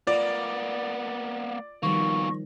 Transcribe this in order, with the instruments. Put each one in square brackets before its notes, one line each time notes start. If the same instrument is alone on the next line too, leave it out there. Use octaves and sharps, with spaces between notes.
[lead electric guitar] A#3 B3 [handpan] F4 [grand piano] D5
[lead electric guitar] B2 A#3 [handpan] D#3 F3 G3 [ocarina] C#6